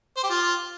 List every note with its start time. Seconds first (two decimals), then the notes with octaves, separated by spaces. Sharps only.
0.17 C5
0.23 G4
0.30 F4